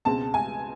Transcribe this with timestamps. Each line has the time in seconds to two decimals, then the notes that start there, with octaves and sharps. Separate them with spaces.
0.05 C#2 B2 G#3 C4 A5
0.34 G#5